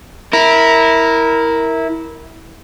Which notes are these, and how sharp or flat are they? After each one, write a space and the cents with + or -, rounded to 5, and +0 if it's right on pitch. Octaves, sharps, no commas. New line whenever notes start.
E4 -15 A#4 +0